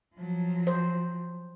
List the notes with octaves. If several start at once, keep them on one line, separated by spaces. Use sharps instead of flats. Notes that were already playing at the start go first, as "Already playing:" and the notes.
F3 F#3
C5